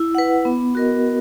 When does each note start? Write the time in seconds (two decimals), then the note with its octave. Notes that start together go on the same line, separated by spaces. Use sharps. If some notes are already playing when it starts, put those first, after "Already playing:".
Already playing: E4
0.15 B4 F#5
0.45 B3
0.75 F#4 A#4 D#5